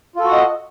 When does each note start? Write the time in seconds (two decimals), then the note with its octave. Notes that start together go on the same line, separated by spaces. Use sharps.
0.16 F4
0.20 A4
0.24 F#4
0.28 F#5
0.33 D#5